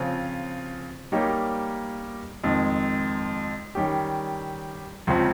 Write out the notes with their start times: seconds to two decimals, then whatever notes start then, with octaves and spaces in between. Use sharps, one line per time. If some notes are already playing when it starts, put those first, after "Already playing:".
Already playing: C#3 F3 C4 F4
1.12 G3 A#3 D#4 G4 C#5
2.44 F2 D#3 G#3
3.75 D#3 G3 C#4 G4
5.07 C#2 C#3 F3 C4